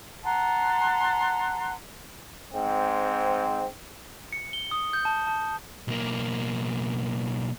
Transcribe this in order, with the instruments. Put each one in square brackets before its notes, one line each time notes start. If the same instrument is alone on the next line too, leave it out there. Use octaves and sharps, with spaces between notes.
[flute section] F#5 A5 A#5 C6
[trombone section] G#2 C4
[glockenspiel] C#7
G7
D#6
G6
A5
A5
[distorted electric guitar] B1 A#3